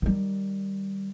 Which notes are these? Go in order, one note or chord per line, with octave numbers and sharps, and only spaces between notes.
D#3 G3